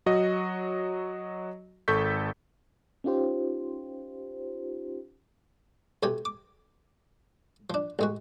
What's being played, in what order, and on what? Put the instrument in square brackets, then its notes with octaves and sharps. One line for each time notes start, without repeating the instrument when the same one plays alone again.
[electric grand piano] F#3 F#4 D#5
G#1 A4 C#6 G6 B6
[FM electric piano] C#4 D#4 F4 G4 C5
[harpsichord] B1 C3 G4 G#5
D6
F3 D4
A1 G#3 F#4